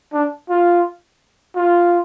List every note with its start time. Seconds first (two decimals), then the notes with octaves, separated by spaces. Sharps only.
0.14 D4
0.49 F4
1.55 F4